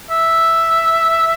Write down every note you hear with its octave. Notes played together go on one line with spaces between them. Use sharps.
E5